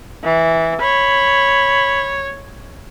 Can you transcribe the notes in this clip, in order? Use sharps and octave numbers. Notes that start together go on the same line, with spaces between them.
E3
C#5 B5